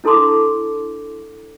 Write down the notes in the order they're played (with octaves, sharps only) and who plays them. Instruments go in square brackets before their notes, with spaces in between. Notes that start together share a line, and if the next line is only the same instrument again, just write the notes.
[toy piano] D4 E4 A4 A5 C6 D6